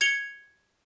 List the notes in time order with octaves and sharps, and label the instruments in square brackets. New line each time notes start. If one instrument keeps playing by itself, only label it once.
[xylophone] G#6 C#7 F7 G7